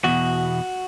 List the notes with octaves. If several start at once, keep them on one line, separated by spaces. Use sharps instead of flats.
E2 B2 F#4